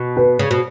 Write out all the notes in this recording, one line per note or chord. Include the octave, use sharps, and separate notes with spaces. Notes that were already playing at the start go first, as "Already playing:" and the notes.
Already playing: B2
B4
C#3
B2